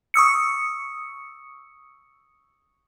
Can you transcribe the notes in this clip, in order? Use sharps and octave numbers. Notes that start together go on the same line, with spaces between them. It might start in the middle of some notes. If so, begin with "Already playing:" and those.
C#6 D#6 E6 C#7